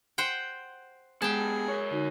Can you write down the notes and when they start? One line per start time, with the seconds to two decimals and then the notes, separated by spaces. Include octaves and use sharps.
0.18 C5 F#5 G5
1.22 G#3 B3 G4 G#4 G5 A5
1.68 A#4 C#5
1.91 D3 D#4 F#4